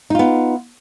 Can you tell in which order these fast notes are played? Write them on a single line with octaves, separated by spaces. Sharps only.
D#4 F4 B3